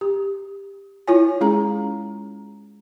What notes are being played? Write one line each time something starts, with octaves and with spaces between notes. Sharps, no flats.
G4
E4 F4 C#5 G#5
G#3 C#4 G#4 A#5